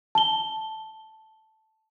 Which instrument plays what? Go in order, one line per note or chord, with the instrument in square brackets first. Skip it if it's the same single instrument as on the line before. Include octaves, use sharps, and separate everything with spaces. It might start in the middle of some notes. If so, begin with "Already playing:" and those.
[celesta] A5 G7